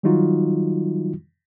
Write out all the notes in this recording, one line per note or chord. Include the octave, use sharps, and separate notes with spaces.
D#3 F#3 G3 D#4 F4 F#4